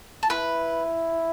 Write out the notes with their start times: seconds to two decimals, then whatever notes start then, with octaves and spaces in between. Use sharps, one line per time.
0.23 A5
0.30 E4 B4 B5